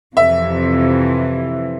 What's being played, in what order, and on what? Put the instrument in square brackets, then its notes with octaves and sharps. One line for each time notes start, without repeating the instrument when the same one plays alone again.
[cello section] F2 C3 E3 [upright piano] E5